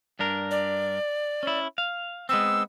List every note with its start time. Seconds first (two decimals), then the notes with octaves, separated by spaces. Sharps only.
0.19 G2 D4 A#4
0.51 D5
1.43 C#4 E4
1.78 F5
2.29 G#3 B3 C4 E6